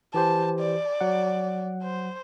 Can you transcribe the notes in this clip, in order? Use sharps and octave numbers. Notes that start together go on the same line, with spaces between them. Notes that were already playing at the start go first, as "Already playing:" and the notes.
E3 G4 C5 A5
D5
F#3 F#5
C5